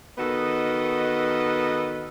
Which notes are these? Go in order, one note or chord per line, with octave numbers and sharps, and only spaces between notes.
D#3 B3 F#4 A4 D#5